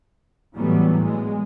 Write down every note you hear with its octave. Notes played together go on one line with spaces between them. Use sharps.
A2 E3 F#3 G3 A3 B3
G#3